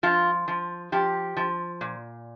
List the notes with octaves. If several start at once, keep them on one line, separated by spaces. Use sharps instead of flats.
F3 F4
F3
F3 G4
F3
A#2